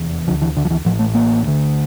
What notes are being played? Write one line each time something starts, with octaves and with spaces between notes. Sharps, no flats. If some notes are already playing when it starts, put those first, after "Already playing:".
Already playing: F1 E2
D2 D3 F3
E3
D3
F3
E3
A1 A2 F3
A3
A#3
D2 D3